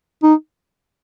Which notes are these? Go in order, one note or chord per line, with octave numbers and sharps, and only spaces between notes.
D#4